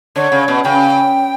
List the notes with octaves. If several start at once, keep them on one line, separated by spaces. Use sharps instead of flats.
D3 C#5
C#3
B2
C#3 G5